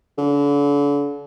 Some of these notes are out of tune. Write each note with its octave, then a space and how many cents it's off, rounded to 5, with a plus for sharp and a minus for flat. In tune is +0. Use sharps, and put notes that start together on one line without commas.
D3 -40